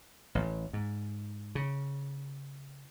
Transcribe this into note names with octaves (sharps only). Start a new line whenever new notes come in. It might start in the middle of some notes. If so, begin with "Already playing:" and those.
A1
G#2
C#3